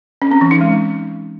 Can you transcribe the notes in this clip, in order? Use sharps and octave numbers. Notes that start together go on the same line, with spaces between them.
C#4
C4
E3
D#4
G#3